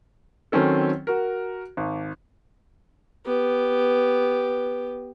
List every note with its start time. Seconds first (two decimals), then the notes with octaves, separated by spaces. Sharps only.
0.52 D#3 F#3 C4 C#4 A4
1.07 F#4 A#4
1.77 G#1
3.26 B3 G4